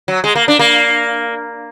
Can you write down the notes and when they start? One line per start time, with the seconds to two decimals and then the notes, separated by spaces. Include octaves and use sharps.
0.08 F#3
0.24 G#3
0.35 A#3
0.48 D4
0.59 A#3